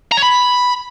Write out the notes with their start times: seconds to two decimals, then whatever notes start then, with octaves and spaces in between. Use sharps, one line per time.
0.12 A#5
0.17 C#5
0.23 B5